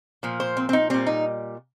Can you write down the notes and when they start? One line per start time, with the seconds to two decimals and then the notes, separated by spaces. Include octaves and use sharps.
0.23 A#2 F3
0.40 C5
0.57 C4
0.69 C4
0.73 D#4
0.90 A#2 G3 C4
1.07 D#4